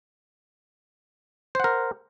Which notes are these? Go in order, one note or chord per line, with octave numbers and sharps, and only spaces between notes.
A#4 C5 F#5